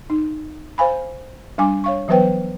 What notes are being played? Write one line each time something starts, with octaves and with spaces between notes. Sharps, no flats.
D#4
C5 F5 G#5 B5
G3 D4 G#5 D6
C#5 F5 C#6
E3 F#3 B3 B4 C5 G5